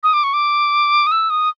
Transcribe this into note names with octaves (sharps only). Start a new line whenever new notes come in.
D#6
D6
C#6
D6
D#6
E6
D#6